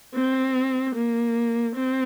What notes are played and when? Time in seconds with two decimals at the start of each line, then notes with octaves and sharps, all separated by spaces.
0.14 C4
0.95 A#3
1.75 C4